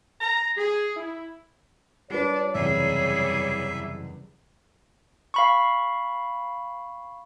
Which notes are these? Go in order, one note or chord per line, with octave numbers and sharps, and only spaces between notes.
A#5
G#4
E4
G3 D4 F4 B4 C#5
F#1 E2 C3 G3 G#4 E5
F5 B5 C#6